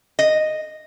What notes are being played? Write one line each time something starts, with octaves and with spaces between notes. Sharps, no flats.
D#5